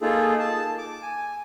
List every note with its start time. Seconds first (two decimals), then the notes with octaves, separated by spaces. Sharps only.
0.01 A#3 D#4 F4 G#4 A4
0.39 A5
0.78 D6
1.02 G#5